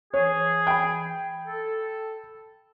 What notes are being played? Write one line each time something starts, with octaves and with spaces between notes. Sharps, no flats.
E3 G#4 C#5
G5 B5
A4